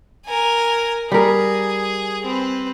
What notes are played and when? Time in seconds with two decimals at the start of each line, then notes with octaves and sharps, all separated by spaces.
0.27 A#4 G#5
1.12 G3 G#4 A#4
2.25 C4 B4